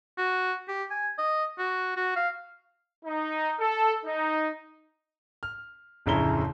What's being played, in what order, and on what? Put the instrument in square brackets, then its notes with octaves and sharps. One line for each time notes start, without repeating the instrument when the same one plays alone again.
[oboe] F#4
G4
G#5
D#5
F#4
F#4
F5
[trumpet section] D#4
A4
D#4
[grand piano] F6
D1 F2 C#3 E4 A#5 G7